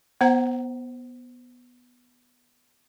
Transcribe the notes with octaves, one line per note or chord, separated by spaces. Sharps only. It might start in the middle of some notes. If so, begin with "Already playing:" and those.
B3 C5 F#5 A#5